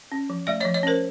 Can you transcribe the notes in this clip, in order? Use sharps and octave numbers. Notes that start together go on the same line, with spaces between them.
C#4
F3
A3 D5 E5
F3 C#5 D#5
C#5 D#5
C#4 A#4 C5